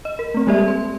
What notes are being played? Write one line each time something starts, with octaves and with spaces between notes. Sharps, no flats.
D#5
A#4
A3 C4
G3 G#3 A#3 G4 D5 E5
C6